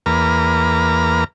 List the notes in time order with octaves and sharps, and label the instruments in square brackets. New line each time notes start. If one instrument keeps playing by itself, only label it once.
[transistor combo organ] E2 A#3 B4 A#5 F6